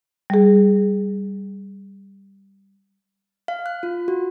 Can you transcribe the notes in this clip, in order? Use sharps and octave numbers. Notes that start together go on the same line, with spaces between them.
G3 G#4
F5
F#6
F4
F#4